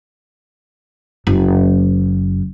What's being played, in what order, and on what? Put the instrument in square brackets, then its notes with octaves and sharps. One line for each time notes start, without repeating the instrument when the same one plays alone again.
[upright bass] F#1